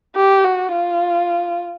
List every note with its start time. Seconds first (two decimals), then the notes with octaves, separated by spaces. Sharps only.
0.16 G4
0.45 F#4
0.72 F4